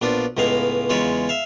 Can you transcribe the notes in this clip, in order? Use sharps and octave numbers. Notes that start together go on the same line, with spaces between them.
A#1 B3 D4 F4
C#2 A2 G#3 B3 F5
E2 C#3 G#3 F4 C#5 B5
E5 F5